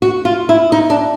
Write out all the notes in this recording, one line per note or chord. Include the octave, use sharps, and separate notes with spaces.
F#4
F4
E4
D#4
D4